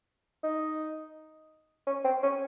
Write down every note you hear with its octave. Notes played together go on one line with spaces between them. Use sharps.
D#4
C#4
C4
C#4